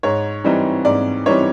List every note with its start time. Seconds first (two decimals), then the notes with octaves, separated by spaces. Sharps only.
0.03 G#2 C#5
0.44 E3 G3 C4 D#4
0.85 G#2 D5
1.26 E3 G3 C4 D#4 C#5